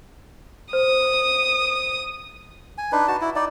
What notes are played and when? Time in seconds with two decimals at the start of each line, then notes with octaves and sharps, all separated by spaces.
0.73 C5 D#6
2.78 G#5
2.92 D4 D#4 B4
3.08 F#4 A5
3.21 E4
3.36 D#4 D5